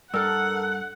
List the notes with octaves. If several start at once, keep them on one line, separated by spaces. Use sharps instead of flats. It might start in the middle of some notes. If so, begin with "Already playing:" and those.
G2 A4 A#4 F#5 E6 F6